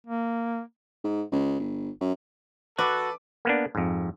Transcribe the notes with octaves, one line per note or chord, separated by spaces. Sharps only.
A#3
G#2
C#2
G1
F#2
F#4 A4 B4 D6
A#3 B3 D4
F2 G#2